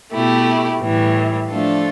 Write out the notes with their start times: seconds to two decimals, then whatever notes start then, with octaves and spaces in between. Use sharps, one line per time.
0.13 B2 A3 E4 G4
0.81 A2 E3 G3
1.49 F3 A3 D4 F4 A4